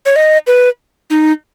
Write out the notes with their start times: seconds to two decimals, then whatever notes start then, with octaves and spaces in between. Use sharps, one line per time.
0.06 C#5
0.16 D#5
0.47 B4
1.10 D#4